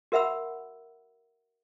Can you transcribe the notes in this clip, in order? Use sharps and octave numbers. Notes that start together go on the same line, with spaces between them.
F#4 A#4 E5 F#5 B5 E6